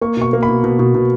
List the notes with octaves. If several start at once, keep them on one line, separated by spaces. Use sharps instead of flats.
A#3 C#6
B2 C#6
A#3
B5
B2
B2
B2
B2